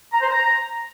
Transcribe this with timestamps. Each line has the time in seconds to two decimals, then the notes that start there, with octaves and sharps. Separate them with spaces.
0.13 A#5
0.21 C5
0.30 A#5